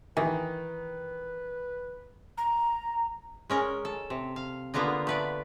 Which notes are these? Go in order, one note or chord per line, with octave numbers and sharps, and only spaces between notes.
D#3 E3 B4
A#5
G#3 C#4 A#4
A4
C3
F5
D3 A#3 B3 F4 D#5
A3 B4 D5